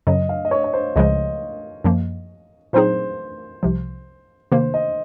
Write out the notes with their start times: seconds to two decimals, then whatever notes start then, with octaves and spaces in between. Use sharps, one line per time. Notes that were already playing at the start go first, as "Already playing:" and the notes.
0.07 F#2 C#3 F#3 D#5
0.29 F5
0.45 D#5
0.51 C#5
0.64 C#5
0.73 C5
0.96 C#2 C#3 F3 G#3 D#5
1.84 F#2 F3 A#3
2.73 A#2 F#3 C4 D#4 G#4 C5
3.63 C2 C3 F3
4.52 C3 D#3 A#3 C5
4.74 D#5